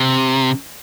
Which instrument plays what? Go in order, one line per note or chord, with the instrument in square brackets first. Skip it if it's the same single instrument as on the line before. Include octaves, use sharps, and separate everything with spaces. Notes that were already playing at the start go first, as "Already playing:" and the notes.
Already playing: [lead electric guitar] C3